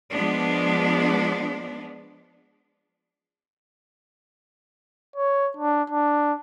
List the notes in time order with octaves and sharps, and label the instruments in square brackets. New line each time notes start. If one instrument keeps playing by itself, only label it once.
[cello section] F3 G#3 B3 D4
[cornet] C#5
D4
D4